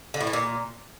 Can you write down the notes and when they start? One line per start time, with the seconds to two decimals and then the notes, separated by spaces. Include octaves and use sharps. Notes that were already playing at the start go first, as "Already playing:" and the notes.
0.14 D3
0.20 A2
0.27 E3
0.33 A#2